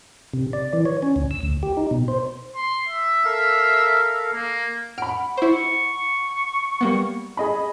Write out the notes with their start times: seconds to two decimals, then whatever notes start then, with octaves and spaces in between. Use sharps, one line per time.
0.33 C3
0.53 D5
0.73 E3
0.85 C#5
1.03 C#4
1.16 D2
1.31 E6
1.43 D2
1.63 G4
1.77 D#4
1.91 B2
2.08 C5
2.55 C6
2.89 E5
3.24 A4 A#4 F5
4.34 A#3
4.98 F#5 B5 F6 D7
5.37 E4 C5 C#6
6.81 G3 A#3 B3
7.37 G#4 D#5 B5